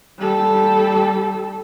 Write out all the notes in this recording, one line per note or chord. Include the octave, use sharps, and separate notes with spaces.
G3 A4